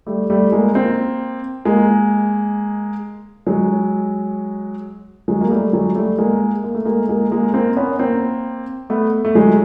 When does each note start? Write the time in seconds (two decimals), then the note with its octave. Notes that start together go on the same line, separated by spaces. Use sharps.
0.07 G3 A3
0.30 G3 A3
0.52 G#3 A#3
0.75 A#3 C4
1.65 G#3 A#3
3.47 F#3 G#3
5.28 F#3 G#3
5.41 A#3
5.50 G3 A3
5.73 F#3 G#3
5.96 G3 A3
6.18 G#3 A#3
6.64 A#3
6.75 A3
6.85 G#3 A#3
7.09 G#3 A#3
7.31 G#3 A#3
7.54 A#3 C4
7.76 B3 C#4
7.99 A#3 C4
8.90 A3 B3
9.25 A3
9.35 F#3 G#3